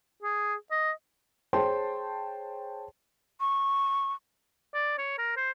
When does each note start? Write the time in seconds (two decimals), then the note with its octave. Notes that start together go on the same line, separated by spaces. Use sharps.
0.23 G#4
0.71 D#5
1.53 G#4 C5 C#5 G5 A5 C6
3.41 C#6
4.74 D5
4.98 C#5
5.18 A#4
5.37 C5